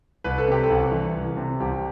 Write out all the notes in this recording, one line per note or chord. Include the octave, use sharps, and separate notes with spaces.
C2 B4
A4
C3 G4
A4
C2
E3
C2
C3
C2 G4